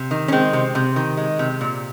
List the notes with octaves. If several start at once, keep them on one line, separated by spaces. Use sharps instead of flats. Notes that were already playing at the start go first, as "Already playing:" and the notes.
Already playing: C3
D#3
C#4
G#3 C4
C3
C3
D#3
G#3
C3
A#2